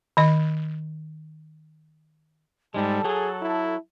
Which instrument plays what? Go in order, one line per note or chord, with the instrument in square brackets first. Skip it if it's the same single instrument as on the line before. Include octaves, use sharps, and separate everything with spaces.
[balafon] D#3 D#5
[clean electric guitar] G#2 G#3 [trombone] G3 [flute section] A4 A5
[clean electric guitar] F#3 [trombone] G#4
[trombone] E4